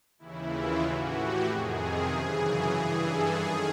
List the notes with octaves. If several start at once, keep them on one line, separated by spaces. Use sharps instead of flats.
D#2 C#3 E3 E4
F4
A2 E3 F#4
G4
F2 C3 D#3 G#4
F#2 C#3 E3 G#4
G2 E3
A4
F#2 D#3 G#4